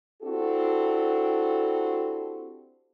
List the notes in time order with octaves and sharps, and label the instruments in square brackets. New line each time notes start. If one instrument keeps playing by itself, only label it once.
[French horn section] C4 D4 E4 F#4 G4 A4